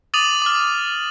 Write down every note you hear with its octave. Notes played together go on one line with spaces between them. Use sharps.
D6 D#6 A6 D#7 F7 F#7
D6 F6